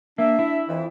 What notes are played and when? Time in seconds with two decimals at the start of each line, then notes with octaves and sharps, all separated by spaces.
0.18 A#3 D4 E5
0.39 E4
0.69 F2 E3